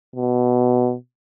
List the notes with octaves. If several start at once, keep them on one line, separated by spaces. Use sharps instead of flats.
B2